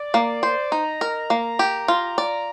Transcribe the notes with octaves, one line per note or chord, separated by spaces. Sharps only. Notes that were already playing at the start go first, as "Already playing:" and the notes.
Already playing: D5
A#3
C5
D#4 A#5
A#4
A#3
G4
F4
D5